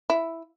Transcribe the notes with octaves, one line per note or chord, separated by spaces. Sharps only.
E4